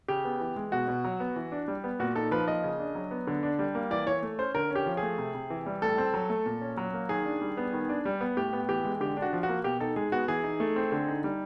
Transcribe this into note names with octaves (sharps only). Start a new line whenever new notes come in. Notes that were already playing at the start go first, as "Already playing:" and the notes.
C#3 G4
B3
E3
G#3
B2 F#4
B2
F#3
B3
E3
D4
G3
B3
A#2 F#4
D#4 A4
F3 B4
A#3 D#5
C#3
D4
F#3
B3
D3
D4
G3
A#3
E3 D5
E3 C#5
A3
C#4 C5
D3 A#4
C#4 G4
F3
A3 G#4
C3
C3
E3
G3
A2 A4
C4
F#3
A3
A#2
C#4
F#3
A#3
D#3 G#4
D4
G3
B3
D#3
D4
G3
B3
A2 G4
B3
E3 G4
G#3
D3 G4
D4
F#4
F3
F#4
A#3
B2 G4
D#4 A4
G#3 G#4
B3 F#4
E3 G#4
D#4
A3
C4
D3
D#4
G3